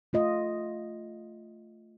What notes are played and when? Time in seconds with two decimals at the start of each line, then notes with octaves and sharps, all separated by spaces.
0.13 A3 F4 D#5